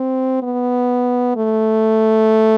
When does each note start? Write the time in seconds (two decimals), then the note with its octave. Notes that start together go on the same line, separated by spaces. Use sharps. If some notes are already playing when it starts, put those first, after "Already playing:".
Already playing: C4
0.42 B3
1.36 A3